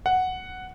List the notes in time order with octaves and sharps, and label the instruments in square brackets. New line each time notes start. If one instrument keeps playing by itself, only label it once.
[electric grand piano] F#5